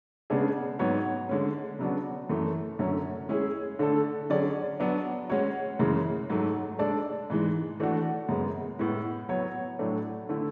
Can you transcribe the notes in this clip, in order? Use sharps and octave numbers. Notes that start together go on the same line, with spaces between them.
C#3 G#3 B3 D4 G#4
G#2 F#3 B3 F#4 C#5
D3 G#3 C#4
C#3 F#3 B3 D4 F#4
F#2 E3 A3
F#2 D3 F#3 C#4
G#3 C#4 E4 G#4
D3 A3 D4 A4
D3 F#3 C#4 G#4 D5
F#3 B3 D4
G#3 C#4 F#4 C#5
F#2 C#3 E3 G#3
G#2 F#3 A3
G#3 D4 A4 D5
G#2 E3 G#3
E3 A3 D4 F#4
F#2 C#3 G#3 B3
A2 G#3 B3 E4
F#3 B3 F#4 C#5
A2 F#3 A3 D4
D3 A3 E4